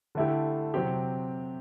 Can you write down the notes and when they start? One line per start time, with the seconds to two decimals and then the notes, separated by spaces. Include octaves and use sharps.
0.15 D3 A3 E4 G4
0.74 C3 F#3 C4 G4